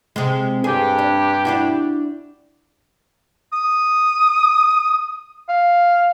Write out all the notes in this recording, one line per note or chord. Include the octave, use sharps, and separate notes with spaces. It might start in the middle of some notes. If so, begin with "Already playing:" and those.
C3 G#3
G2 G4 G#4
D4
D4 E4 F#4
D#6
F5